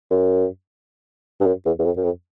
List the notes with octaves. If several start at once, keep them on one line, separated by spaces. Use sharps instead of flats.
F#2
G2
F#2
E2
E2
F2
F#2
F2